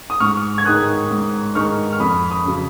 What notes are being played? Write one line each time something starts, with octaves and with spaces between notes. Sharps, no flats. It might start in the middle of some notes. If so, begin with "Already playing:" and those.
D#6
G#2 C#6 F6
G#6
D#3 G#3 D#4 D#6 F#6
G#2
D#3 G#3 D#4 C#6 F6
F6
F2 B5 D#6
B5 D#6
C#3 F#3